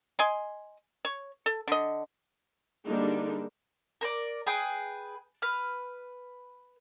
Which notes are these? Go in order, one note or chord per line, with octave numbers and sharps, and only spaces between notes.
D#5 G#5 C6
C#5
A4
D3 D#5
D3 G3 G#3 A#3 D4 D#4
A#4 C5 D5
G#4 B4 G5
B4 F6